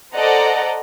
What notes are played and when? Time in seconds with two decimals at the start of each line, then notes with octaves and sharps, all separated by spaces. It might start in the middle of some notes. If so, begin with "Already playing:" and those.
0.14 A4 C5 D5 D#5 F#5 A#5